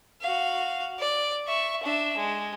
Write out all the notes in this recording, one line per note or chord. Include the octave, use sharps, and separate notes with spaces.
F#4 F5
D5
E5 C#6
D4 E5
G#3